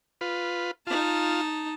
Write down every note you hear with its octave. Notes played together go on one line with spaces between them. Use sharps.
F4 B4
D#4 F4 A5